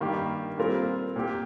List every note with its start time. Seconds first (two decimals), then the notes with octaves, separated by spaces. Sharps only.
0.01 G2 D#3 A#3 G4
0.58 A#2 G3 C4 F4 A#4
1.16 A#2 A#3 G4